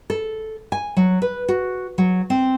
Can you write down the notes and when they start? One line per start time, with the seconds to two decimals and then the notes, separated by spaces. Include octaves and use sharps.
0.10 A4
0.72 G#5
0.97 F#3
1.22 B4
1.48 F#4
1.98 F#3
2.30 C4